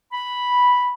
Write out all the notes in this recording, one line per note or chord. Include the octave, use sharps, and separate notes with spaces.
B5